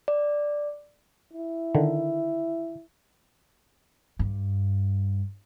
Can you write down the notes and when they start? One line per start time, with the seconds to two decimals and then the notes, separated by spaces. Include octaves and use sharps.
0.08 D5
1.33 E4
1.75 D3 D#3
4.19 G2